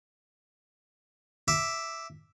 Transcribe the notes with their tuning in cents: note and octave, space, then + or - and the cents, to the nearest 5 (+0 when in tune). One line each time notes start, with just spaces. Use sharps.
E5 +0 D6 +0